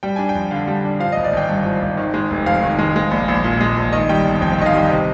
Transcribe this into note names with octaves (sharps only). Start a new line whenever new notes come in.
G3 G5
D4 G#5
G5
F2
D3 F5
G3
D4
F3 F5
D#5
G#1
D5
G#1 G5
G2
F3
G#1
D#3
G#3
F1
F2 F5
D#3
G#3
G#3
A#1
A#1
A#2
G#3
A#1
D#3 D#5
G3 G5
G1
F2 G5
G5
D#3 D#5
F5
G3 G5
C3 D#5